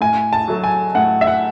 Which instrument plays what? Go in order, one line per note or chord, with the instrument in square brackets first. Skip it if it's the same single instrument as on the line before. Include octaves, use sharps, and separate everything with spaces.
[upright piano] A2 G#5
A5
F#3 A3
G#5
A2 F#5
E5
F#5